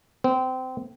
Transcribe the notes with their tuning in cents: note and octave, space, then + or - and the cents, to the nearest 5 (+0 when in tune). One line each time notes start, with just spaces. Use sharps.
C4 -25